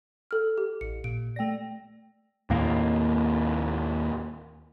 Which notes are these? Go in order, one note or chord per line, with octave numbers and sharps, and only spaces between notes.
A4 F6
G4
A1 C#7
A#2 D7
A3 D5 G5 A#6
D#2 A2 D#3 A#3